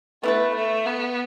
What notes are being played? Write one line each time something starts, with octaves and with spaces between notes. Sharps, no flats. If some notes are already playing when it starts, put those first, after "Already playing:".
A3 B3 E4 B4
A3
B3